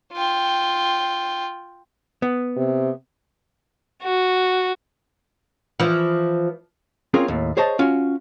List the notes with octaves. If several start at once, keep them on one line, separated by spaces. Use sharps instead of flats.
F4 G5
B3
C3
F#4
E3 F3
C4 C#4 F4 G#4 A#4
D#2 A2
G#4 C5 C#5 D#5 A5
C#4 F4 F#4